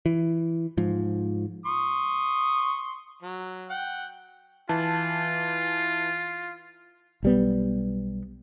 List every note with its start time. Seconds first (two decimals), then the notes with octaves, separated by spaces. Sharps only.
0.06 E3
0.77 G#2 F3
1.66 C6 C#6 D#6
3.23 F#3
3.70 F#5 G5
4.69 E3 F4 A5
7.23 B1 G3 B3